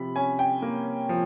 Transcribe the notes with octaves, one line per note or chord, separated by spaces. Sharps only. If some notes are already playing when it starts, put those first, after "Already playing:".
Already playing: C3 F3 B5
C#4 G#5
G5
A#3
F3